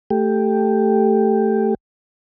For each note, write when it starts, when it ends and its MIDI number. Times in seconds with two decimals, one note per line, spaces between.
0.10 1.75 57
0.10 1.75 67